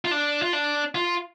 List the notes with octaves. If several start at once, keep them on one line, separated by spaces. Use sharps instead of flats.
F4
D4
F4
D4
F4